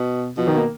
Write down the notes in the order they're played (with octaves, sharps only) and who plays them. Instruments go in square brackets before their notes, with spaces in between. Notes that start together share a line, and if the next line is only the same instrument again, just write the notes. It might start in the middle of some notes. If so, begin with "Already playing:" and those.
Already playing: [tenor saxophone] B2
[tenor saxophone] B2 [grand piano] F3
[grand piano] D#3
A#3